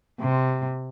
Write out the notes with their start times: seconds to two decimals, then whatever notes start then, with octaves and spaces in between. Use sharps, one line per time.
0.21 C3